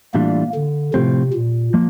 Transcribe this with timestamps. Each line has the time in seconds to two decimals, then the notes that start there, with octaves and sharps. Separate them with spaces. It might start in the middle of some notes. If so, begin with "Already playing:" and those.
0.14 A2 E3 G3 A#3 D4 F4
0.55 D3
0.94 A2 C3 F3 C4
1.34 A#2
1.74 F3 A#3